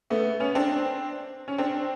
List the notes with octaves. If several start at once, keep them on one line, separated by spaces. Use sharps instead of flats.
A3 B3
B3 C#4
C4 D4
C#4
C4 D4